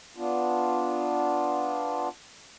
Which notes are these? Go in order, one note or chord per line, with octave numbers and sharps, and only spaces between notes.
B3 D4 F4